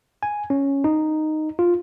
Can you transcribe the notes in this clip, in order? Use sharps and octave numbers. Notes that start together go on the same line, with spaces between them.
G#5
C#4
D#4
F4